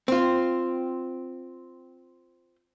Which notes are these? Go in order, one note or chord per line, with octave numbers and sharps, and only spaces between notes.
C4 F4